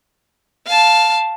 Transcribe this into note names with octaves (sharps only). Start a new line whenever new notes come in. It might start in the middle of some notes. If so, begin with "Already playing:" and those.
F5 A5